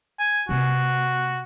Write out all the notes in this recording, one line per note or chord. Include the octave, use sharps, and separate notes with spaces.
G#5
C3 A#3 F#4